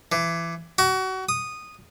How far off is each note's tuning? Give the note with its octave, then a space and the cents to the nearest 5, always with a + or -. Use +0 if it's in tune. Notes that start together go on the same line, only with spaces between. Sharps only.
E3 +25
F#4 +30
D#6 -10